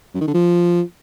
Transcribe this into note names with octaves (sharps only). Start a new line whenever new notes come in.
F#2
D#3
D3
F3